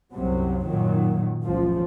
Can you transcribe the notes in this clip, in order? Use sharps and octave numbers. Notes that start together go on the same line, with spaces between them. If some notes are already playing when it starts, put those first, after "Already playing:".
C2 F#2 C3 F#3
F#2 A#2 D#3 F#3
F#1 C#2 F3